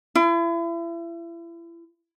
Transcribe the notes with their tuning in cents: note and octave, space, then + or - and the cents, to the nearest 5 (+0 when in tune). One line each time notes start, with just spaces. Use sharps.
E4 +35